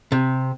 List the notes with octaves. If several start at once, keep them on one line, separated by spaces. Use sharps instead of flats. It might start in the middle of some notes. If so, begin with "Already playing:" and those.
C3